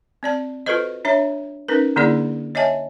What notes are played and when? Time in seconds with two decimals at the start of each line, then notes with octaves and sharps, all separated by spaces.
0.23 C4 D5 A5
0.66 F4 F#4 A4 B4 C5 D#5
1.05 D4 C#5 E5 A#5
1.68 C#4 D#4 A#4 B4
1.96 D3 A#3 D4 E4 G#4 D5
2.55 C#5 D#5 E5 G#5 A5